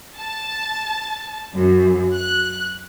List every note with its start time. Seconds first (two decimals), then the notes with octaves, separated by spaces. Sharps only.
0.16 A5
1.55 F#2
2.14 F#6